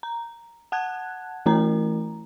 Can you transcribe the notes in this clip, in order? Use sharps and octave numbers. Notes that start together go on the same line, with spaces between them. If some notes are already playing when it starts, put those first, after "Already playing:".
A#5
F#5 A5 F#6 G#6
E3 A3 E4 A#4 A#5